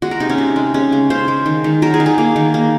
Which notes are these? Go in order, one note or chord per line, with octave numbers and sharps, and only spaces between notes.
G#3 F#4
A#4
C3 D#4
C#4
C3
G#3
G#3 C#4
C#3
C#3 C5
G#3
D#3
D#3
F#3 A#4
G#4
D#3
G#4
A#3
D#3
A#3